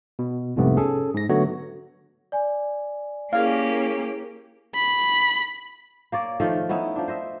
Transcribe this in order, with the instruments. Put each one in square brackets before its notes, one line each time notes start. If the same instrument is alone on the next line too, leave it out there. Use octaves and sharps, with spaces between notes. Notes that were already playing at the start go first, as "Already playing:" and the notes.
[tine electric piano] B2
C2 F2 G#2 C3 A3 B3
C#4 G#4 A4
G#2 A#6
D3 F#3 A3 B3 F#4 C#5
[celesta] D5 G#5
[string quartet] A#3 C#4 G4 [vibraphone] E4 G#4 A#4 [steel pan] F5
[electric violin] B5
[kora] A#3 C#5 D5
D#3 F3 A3 A4
B3 C#4 D#4 E4
F3 D4
C5 D#5 E5